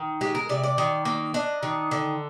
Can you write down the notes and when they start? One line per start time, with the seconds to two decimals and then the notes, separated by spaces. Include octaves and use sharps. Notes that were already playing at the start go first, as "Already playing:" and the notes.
Already playing: D#3
0.21 G#3 G4
0.35 A#4
0.49 C3 D5
0.63 D5
0.78 D#3
1.05 A#3
1.34 D4 D#5
1.63 D#3
1.91 D3